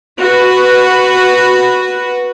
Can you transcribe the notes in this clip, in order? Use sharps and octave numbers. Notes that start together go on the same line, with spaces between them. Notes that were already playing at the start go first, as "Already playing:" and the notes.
F#4 B4